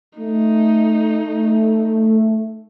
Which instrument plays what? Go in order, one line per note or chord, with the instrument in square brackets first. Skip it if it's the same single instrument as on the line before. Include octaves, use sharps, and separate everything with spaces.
[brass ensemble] A3 [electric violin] D#4